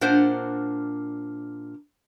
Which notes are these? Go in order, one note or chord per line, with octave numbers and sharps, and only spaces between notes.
A#2 D4 A#4 C5 F#5